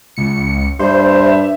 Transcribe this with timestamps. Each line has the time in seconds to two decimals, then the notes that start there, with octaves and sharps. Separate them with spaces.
0.17 C#2 C#7
0.80 G2 C5 E5